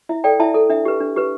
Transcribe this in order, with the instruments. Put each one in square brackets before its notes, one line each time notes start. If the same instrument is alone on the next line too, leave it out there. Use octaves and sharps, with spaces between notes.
[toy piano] E4 E5
A4 D5 G5
E4 E5 A5
A4
D4 E5
G4 B4
D4
G4 B4